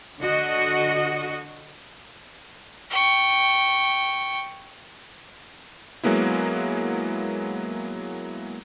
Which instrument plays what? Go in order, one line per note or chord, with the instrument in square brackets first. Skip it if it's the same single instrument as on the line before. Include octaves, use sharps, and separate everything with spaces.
[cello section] D3 F#4 D#5
[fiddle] G5 C#6
[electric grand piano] F#3 G#3 A#3 B3 E4